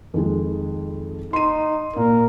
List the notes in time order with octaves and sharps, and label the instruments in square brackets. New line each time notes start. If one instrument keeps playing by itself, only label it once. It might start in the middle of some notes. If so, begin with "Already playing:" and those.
[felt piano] F2 D#3 G#3
[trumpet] D#4 [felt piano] C6 D#7
[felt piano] A#2 [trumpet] A#4